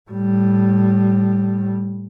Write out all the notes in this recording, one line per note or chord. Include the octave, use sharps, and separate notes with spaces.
A2 G3